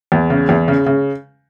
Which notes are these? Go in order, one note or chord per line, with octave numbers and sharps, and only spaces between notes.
E2
C#3
E2
C#3
C#3